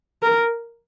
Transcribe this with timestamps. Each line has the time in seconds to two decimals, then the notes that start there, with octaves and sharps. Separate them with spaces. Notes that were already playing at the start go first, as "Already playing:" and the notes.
0.23 A#4